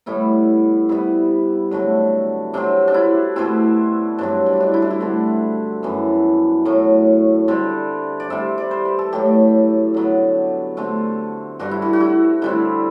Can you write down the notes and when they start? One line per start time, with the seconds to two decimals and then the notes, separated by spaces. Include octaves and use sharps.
0.06 A2 G3 B3 E4
0.89 C3 G3 B3 E4
1.71 D3 F#3 A3
2.53 C3 F#3 C4 D4
2.88 D4
2.94 E4
3.36 B2 A3 C4 E4
4.18 G2 F#3 C4 D4
4.46 D4
4.53 E4
4.60 D4
4.74 E4
4.82 D4
4.90 E4
5.00 D3 A3 C4 F#4
5.83 F#2 E3 B3
6.65 A2 F#3 A3
7.48 D3 G3 C4
8.20 D5
8.30 C3 G3 C4 E5
8.58 D5
8.71 C5
8.85 B4
8.99 A4
9.12 A2 F#3 A3 G4
9.94 D3 F#3 B3
10.77 D3 A3 C4
11.59 G2 D3 G3 F#4
11.71 E4
11.82 F#4
11.93 F#4
12.01 E4
12.42 D3 G3 C4 E4